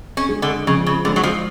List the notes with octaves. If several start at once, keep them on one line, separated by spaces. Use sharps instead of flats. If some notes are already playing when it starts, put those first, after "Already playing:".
C#4
G#3 D4 G#4
D3
C#3 F3
C#3
D3 G#3 D4 G#4
F#3
F3